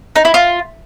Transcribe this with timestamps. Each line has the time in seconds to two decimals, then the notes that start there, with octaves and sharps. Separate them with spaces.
0.16 D#4
0.25 E4
0.34 F4